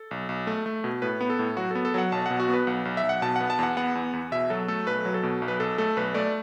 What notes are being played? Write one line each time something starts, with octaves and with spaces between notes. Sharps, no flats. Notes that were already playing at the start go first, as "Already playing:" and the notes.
Already playing: A4
B1
B1
A3
A3
B2
A2 B4
B3
A4
A2
F#3 F#4
B3 A4
A4
F#3 F#5
B1 A5
B2 F#5
F#4
B3 B4
B1 F#5
B1
E5
B1
F#5
B2 A5
B3 F#5
A5
E2 F#5
B3 F#5
E2
E2
B2 E5
F#3 A4
A3 A4
B1 B4
F#3
A4
B2
B1
B4
B1 A4
A3 A4
B1 B4
A3 D5